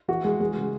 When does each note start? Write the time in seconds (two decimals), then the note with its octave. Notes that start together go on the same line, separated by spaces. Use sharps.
0.08 E3 F#4
0.24 E3 G#3
0.40 E3 G#3
0.57 C#3